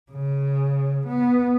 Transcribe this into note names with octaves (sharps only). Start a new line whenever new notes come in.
C#3
B3